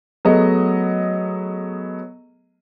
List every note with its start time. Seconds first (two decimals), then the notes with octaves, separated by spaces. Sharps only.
0.25 F#3 A3 B3 G#4 D#5